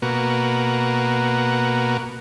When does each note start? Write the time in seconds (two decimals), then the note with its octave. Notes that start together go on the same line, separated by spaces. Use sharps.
0.02 B2 A#3 F#4